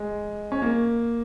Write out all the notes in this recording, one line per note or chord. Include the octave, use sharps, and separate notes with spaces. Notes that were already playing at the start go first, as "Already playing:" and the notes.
Already playing: G#3
C#4
A#3